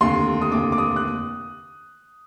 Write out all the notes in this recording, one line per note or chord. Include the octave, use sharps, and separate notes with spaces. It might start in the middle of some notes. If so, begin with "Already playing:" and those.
F1 D#2 D3 C6
D#6
F1 D#2 D3 D6
D6
D#6
F#6